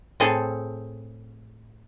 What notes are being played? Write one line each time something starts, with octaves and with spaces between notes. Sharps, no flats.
A2 C4 G#4 A4